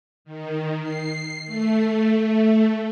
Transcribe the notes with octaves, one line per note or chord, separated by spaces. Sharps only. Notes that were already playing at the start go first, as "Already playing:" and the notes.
D#3
C7
A3